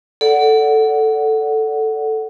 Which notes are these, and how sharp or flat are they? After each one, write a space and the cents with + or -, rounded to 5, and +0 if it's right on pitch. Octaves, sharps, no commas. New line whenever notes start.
A4 +0 D5 -20 F#5 +0